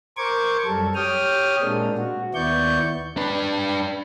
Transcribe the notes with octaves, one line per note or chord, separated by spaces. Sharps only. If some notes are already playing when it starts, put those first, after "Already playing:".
A#4 C5 C#6 D6 G#6
F#2 G3 A4
G4 C#5 G5 D#6 F6
A#2 G#3 A#3 C4 D4
F#4
D#2 B3 E4 D5 C#6 G6
D4 B4